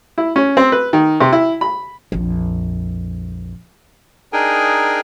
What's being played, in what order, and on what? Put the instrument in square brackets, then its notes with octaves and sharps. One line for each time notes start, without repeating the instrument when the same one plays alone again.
[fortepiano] E4
C#4
C4
B4
D#3
C3
E4
B5
[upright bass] A#1 F2
[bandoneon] D4 D#4 G#4 A#4 G5 G#5